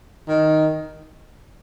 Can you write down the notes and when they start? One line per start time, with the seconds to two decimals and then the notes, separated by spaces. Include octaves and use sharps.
0.29 D#3